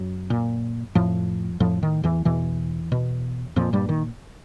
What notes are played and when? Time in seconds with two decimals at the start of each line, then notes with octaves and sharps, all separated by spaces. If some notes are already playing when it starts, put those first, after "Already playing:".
Already playing: F#2 F#3
0.30 A#2
0.95 F2 A2 F3
1.60 F2 A2 F3
1.83 D#3
2.04 E2 E3
2.25 E2 B2 E3
2.92 B2
3.56 F2 A#2 F3
3.73 G2 G3
3.89 D#3